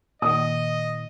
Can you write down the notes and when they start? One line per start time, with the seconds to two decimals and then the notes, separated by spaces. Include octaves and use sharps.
0.22 A#2 D#3 D#5 D#6